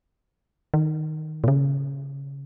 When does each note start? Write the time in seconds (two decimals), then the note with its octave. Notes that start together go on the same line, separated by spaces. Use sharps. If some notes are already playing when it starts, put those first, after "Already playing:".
0.74 D#3
1.44 A#2
1.48 C#3